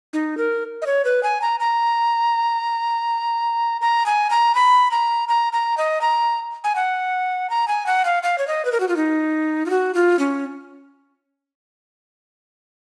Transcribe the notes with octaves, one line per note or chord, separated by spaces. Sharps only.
D#4
A#4
D#5
C#5
B4
G#5
A#5
A#5
A#5
G#5
A#5
B5
A#5
A#5
A#5
D#5
A#5
G#5
F#5
A#5
G#5
F#5
F5
F5
C#5
D#5
B4
A#4
F#4
F4
D#4
F4
F#4
F4
C#4